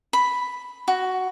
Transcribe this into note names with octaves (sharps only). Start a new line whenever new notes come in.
B5
F#4